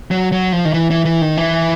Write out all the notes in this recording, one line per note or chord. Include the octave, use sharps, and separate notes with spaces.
F#3
F#3
F3
D#3
E3
E3
E3
D#3
E3